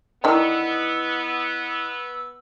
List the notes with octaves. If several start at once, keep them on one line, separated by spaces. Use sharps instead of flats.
D3 D#3 B3 D4 E4 D#5 E6